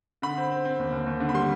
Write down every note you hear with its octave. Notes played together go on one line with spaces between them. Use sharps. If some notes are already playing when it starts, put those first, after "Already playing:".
D3 B5
C4
C4
C4
D#2
D#2
D#2
D3
B5
G3 C6